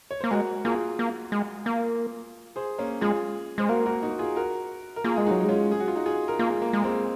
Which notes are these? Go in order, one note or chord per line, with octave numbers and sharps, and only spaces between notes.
C#5
A#3 C5
G#3 F#4 A#4
A#3 F4 G#4
A#3
G#3
A#3
G#4 C5
A#3 C#4
G#3 F4 G#4
G#3 C5
A#3 F#4 A#4
F#4 A#4
D#4 F#4
F4 G#4
F#4 A#4
A#4
A#3 F4 G#4
G#3 G#4
F#3 D#4 F#4
D#4
G#3 C#4 F4
G#4
F#4
F4
D#4 F#4
F4 G#4
A#4
A#3 F4 G#4
G#3
A#3
G#3
A#3
G#3 C4